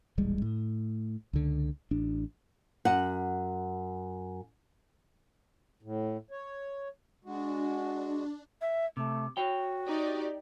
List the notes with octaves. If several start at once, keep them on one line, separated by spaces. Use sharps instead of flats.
D#1 A1 G3 G#3
A2
C#2 D3
A1 D4
F#2 F#5
A2
C#5
G#3 D4 F#4
E5
C3 A3
F#4 C#5 G5
D#4 G4 D5